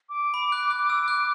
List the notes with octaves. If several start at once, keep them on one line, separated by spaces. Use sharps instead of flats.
D6
B5
F#6
F#6
E6
F#6